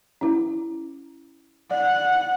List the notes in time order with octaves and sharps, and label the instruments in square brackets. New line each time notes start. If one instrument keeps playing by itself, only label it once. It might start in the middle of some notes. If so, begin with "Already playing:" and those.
[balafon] C#4 E4
[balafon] D5 [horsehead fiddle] F#5